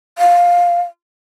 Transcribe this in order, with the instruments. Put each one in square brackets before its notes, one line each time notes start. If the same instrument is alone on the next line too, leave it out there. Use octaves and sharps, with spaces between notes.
[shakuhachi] F5